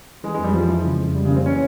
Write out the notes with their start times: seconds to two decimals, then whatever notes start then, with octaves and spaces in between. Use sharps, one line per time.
0.24 E3 G#3
0.34 G#3
0.39 F2
0.44 G3
0.54 F3 G#3
0.69 E4
0.84 C#3
1.00 F2
1.15 G3
1.25 C#3
1.31 A#3
1.36 C4
1.46 E3 C#4